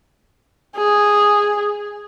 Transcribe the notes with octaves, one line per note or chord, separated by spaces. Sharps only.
G#4